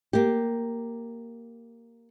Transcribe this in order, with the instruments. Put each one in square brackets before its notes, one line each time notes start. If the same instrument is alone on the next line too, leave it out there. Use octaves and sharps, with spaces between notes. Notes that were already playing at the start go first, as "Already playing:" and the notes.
[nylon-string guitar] A#3 G4